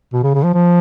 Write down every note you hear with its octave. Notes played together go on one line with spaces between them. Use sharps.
B2
C#3
C#3
F3
F3